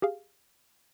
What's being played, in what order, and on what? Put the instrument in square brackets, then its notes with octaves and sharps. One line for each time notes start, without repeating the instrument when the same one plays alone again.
[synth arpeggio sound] G4 G#4 F5